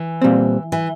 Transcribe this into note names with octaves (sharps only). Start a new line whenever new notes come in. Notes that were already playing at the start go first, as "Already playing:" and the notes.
Already playing: E3
A#2 G3 C4
E3